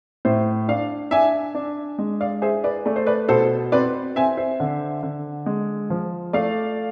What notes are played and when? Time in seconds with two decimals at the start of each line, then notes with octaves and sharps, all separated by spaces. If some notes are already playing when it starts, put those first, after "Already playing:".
0.25 A2 C5 E5
0.68 D4 D5 F5
1.11 D4 E5 G#5
1.55 D4
1.98 G#3
2.21 D5 F5
2.42 G#4 C5 E5
2.64 B4 D5
2.86 A3 D5
2.96 C5
3.07 B4 D5
3.29 B2 A4 C5
3.72 C4 B4 D5
4.16 C4 E5 G#5
4.37 C5 E5
4.60 D3
5.03 D3
5.46 G#3
5.90 F3
6.33 A3 D5 F5